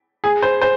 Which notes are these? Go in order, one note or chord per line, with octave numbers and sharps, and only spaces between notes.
G#4
C5
C5